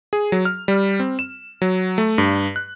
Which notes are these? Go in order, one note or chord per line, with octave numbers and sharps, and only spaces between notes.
G#4
F#3
F6
G3
C4
E7
F#3
A3
G2
F#6